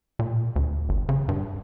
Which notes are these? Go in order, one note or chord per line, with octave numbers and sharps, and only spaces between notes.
A#2
D2
G1
C#3
G2